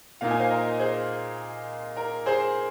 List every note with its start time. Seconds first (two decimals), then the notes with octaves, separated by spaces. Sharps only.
0.21 A#2 A#3 D#4 F5
0.31 G#5
0.39 C5 F5
0.50 A#4 D#5
0.79 G#4 C5
1.97 A#4
2.26 G#4 C5